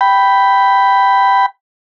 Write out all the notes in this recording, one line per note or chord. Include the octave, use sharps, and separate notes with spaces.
G5 B5